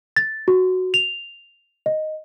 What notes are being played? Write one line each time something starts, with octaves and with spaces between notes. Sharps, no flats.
A6
F#4
F7
D#5